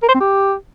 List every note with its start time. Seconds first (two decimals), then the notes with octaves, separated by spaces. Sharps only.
0.03 A#4
0.08 C5
0.14 C4
0.20 G4